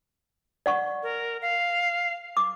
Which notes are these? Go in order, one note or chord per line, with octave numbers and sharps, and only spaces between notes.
D5 F#5 C#6
A#4
F5
D6